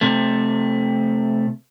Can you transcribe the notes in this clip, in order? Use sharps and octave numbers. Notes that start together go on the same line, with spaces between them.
C3 A3